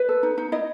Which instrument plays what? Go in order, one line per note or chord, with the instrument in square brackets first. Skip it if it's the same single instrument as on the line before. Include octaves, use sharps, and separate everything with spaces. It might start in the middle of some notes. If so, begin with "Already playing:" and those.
Already playing: [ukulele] B4
A4
D#4
D#4
E4 D#5